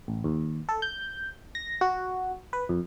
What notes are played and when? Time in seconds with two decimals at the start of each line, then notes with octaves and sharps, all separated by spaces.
0.08 A1
0.24 D#2
0.69 A4
0.82 G6
1.55 A#6
1.81 F#4
2.53 B4
2.69 F2